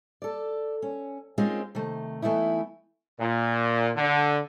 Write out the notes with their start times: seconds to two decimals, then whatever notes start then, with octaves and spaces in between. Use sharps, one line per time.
0.22 A4 D5
0.82 C#4
1.38 G#3 C4 C#4 D#4 F4 A#4
1.75 C3 D#3 A3
2.22 E3 A3 B3 D#4 E4
3.19 A#2
3.96 D3